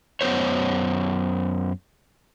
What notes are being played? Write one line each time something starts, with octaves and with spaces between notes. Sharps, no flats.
F#2 B3 C5 C#5